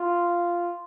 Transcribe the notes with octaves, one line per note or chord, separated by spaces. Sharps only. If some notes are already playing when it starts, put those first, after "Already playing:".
Already playing: F4